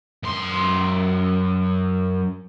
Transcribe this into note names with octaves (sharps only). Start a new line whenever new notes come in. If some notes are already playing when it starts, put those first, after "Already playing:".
F#2 C6